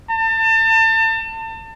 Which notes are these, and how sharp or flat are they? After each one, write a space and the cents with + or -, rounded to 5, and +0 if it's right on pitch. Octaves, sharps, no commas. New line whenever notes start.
A5 +35